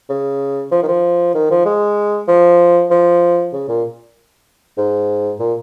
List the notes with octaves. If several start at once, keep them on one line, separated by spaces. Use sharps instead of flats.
C#3
F3
D#3
F3
D#3
F3
G#3
F3
F3
C#3
A#2
G#2
A#2